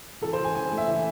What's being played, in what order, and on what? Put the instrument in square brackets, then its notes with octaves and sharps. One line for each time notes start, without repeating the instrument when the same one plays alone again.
[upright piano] E3 A4
C5
E3
G#5
E3 G#5
A3
E5
E3